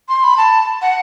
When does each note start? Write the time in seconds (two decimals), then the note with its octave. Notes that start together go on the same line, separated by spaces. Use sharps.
0.09 C6
0.24 B5
0.37 A5
0.82 F#5